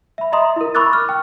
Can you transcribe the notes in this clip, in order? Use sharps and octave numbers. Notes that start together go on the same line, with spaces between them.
E5 B5
D#5 E5 A#5 C6 D#6
E4 A#4
B5 C#6 D6 E6 F#6 A6
F6
G5